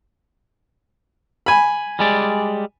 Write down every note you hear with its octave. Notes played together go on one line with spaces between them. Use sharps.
G#5 B5
G3 G#3 D5